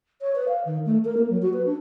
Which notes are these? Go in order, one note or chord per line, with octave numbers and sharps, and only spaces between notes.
C#5
B4
F5
D#3
A3
A#4
A#3
F#3
F#4
B4
D4